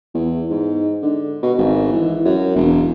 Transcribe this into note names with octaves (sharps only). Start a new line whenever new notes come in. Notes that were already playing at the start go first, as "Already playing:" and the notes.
E2
G#2
D3
B2
G#1
E3
F#2
E1